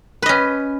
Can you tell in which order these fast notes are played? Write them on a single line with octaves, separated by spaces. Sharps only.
B4 D#5 C#4